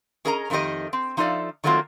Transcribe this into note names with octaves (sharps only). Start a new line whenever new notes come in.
C#4 G#4 A#4 D#5 G#5 A#5
F2 D#3 A3 D#4 G4 D#5
C4
F3 D#4 F4 A4 D5 E5
D#3 F#3 A3 A#3 C4 F4